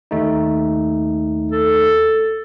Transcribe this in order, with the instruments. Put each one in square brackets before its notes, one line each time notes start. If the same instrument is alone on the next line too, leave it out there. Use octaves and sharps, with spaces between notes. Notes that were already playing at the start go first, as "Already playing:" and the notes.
[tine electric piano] D#2 A3 D#4
[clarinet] A4